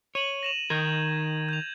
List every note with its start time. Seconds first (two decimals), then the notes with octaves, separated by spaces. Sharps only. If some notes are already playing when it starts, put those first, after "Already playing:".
0.15 C#5 D#7 F#7
0.43 A#6 E7 F7
0.70 D#3 A#4 G6 G#6
1.49 G6 F7